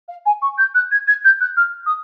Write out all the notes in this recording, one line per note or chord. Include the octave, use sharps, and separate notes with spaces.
F5
G#5
C#6
G6
F#6
G#6
G#6
G6
F#6
F6
D#6